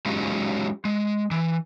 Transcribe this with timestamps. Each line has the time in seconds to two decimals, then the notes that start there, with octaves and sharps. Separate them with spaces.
0.06 F#3 G#3 C#4 D#4 F4 G4
0.85 G#3
1.31 E3